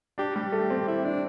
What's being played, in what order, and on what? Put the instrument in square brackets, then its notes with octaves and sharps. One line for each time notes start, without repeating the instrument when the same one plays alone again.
[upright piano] D4 [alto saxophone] G4
[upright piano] G3 [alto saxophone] G4
[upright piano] A3
C4
[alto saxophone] E4
D4